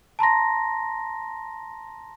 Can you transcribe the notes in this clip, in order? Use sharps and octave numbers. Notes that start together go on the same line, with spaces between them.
A5 A#5 C6 A#6